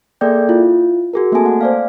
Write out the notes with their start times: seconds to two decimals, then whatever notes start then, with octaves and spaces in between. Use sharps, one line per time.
0.21 A#3 G#4 A4 D5 G5 G6
0.49 E4 F4
1.13 F#4 G#4 A#4
1.32 A3 A#3 C4 A4 G#5 A5
1.46 F#5
1.61 C5 D5 F5